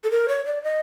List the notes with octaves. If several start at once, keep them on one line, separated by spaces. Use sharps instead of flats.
A4
A#4
C#5
D5
D#5